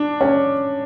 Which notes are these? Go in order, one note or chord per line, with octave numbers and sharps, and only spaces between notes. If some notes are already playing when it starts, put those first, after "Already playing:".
Already playing: D4
C#4